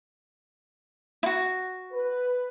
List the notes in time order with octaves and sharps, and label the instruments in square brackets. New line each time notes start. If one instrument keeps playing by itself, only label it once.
[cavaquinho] E4 F#4
[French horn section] B4